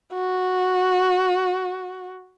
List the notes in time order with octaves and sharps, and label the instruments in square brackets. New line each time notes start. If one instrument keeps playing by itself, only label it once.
[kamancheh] F#4